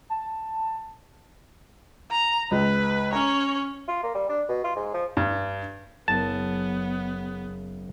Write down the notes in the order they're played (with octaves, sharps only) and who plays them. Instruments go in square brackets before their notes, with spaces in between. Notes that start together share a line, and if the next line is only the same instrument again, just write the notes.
[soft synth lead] A5
[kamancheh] A#5
[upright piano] C#2 [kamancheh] B4
[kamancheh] C#4 C#5 [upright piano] A#5
[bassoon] F4
A#3
G3
D4
B2
F4
G#2
F3
[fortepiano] G2
[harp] F#1 G#4 [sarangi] B3 [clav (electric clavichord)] A5